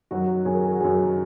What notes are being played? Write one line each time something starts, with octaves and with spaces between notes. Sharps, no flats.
F#2 D#3 F#3 F#4
F#2 D#3 F#3 G#4
A#4
G#4
F#4
F#2 D#3 F#3 G#4